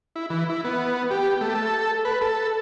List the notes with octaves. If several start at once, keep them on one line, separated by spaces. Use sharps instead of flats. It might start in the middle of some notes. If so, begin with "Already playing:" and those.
E4
E3
E4
B3
G4
A3
A4
B4
A4